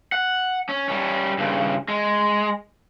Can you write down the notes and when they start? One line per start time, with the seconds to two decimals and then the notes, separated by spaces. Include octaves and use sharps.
0.12 F#5
0.69 C#4
0.89 G3 C#4
1.38 G2 C#3
1.88 G#3